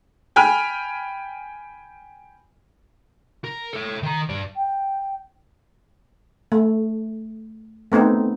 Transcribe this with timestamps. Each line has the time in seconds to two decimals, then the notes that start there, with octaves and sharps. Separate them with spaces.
0.36 G5 G#5 B5 F6
3.44 A#4
3.74 A4 C#5
4.03 D#3 A#5
4.29 G2 D5
4.56 G5
6.52 A3
7.92 A3 B3 C4 D#4